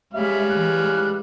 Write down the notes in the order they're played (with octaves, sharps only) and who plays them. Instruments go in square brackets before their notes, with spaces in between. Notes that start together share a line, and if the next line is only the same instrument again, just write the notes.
[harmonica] G3 C#4 F5 [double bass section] G#3 [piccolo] E5
[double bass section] E3 G#3 [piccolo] F#6